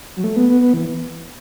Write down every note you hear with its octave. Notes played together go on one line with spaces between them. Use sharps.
F#3
A3
B3
B3
B3
E3